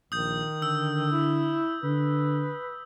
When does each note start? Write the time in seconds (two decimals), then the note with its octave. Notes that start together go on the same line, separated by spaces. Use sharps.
0.12 A#1 D#3 D#6 G6
0.62 D3 E6
1.12 E4
1.83 D3 B4